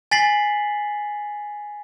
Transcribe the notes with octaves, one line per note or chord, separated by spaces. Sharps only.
G#5 A6 B6 C7 F#7